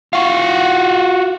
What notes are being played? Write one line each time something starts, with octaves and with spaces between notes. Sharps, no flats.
F4 F#4